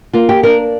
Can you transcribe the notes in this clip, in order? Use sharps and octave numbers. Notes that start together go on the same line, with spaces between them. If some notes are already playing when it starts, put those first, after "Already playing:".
A#3 F4
G4
D4 A#4